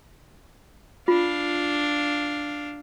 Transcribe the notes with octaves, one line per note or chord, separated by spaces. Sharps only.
D4 F4 F5